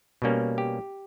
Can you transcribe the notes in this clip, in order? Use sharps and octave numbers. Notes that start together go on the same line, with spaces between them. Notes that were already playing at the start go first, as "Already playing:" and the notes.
B2 G3 A#3 C#4
G4